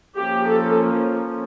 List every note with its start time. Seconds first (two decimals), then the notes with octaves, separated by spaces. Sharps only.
0.17 F3 A#3 C#4 G4
0.48 A4